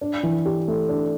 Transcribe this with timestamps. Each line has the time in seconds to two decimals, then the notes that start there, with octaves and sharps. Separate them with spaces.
0.01 D4
0.23 E3
0.46 G4
0.68 A3
0.89 D4